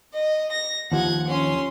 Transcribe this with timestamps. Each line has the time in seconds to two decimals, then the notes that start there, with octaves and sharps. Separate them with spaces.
0.14 D#5
0.52 A#6
0.92 D#2 F3 F#5 G#6
1.27 C#4 C6